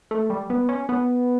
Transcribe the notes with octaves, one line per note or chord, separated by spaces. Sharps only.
A3
G3
B3
C#4
B3